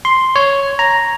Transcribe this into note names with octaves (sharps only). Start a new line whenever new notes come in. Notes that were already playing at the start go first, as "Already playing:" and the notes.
C6
C#5
A#5